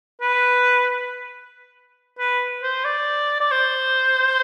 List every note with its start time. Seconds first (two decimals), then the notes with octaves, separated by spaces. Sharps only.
0.21 B4
2.19 B4
2.63 C5
2.85 D5
3.40 D5
3.51 C5